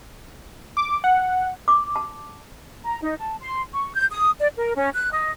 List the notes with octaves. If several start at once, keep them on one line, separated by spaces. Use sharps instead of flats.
D6
F#5
D6
A5
A#5
D#4
A5
C6
C#6
G6
D#6
D5
A#4
C#4
F#6
D#5